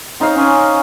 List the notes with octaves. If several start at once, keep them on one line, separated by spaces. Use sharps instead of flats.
C4 D#4 C#5 F5
C#4 G#5